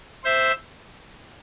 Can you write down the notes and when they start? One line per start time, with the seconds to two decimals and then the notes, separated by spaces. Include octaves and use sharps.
0.24 C5 E5